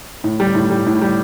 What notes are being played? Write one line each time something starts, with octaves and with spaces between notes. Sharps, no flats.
A2
G3
A2
G3
A2
G3